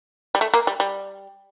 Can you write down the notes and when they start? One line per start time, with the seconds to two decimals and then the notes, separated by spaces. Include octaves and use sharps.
0.35 G3
0.41 A3
0.54 A#3
0.67 G3
0.80 G3